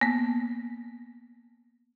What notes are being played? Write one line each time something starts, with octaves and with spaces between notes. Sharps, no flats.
A#3 B3